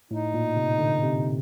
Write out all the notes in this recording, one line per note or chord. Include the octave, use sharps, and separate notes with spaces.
A2 D#4
A#2
C3
D3
C3